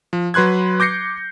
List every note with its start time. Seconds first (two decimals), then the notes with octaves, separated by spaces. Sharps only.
0.13 F3
0.34 F#3 B4 C6 F#6 G#6
0.80 D6 G6 A#6 C7 C#7